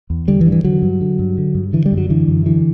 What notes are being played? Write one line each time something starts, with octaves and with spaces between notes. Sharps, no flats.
E2
D3 G3
E3
G2
E3
D3 F#3
G2
D3
G2
D3
G2
D3 E3
G3
F#2
F#3
D3 E3
F#2
D3 E3